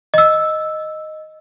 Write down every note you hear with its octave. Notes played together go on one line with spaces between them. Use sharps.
D#5 E6